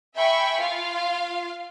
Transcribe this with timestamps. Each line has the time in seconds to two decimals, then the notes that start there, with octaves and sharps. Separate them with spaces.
0.15 E5 G5 G#5 B5 C#6
0.58 F4 F5